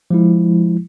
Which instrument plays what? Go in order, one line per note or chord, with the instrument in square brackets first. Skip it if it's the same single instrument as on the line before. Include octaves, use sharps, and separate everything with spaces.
[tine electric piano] F3 G#3 E4